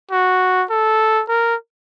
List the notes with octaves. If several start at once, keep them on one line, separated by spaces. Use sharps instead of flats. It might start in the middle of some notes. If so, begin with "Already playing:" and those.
F#4
A4
A#4